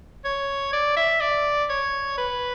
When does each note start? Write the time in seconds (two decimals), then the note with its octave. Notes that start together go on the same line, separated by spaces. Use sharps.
0.25 C#5
0.73 D5
0.96 E5
1.21 D5
1.69 C#5
2.18 B4